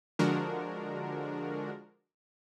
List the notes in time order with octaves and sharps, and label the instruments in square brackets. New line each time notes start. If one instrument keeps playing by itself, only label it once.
[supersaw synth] D3 F3 G#3 D4 F#4 A#4